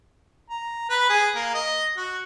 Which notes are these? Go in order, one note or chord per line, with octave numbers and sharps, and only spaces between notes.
A#5
B4
G#4
A#3
D#5
F#4